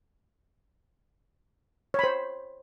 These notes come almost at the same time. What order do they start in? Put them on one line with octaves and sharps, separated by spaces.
C#5 B5 C5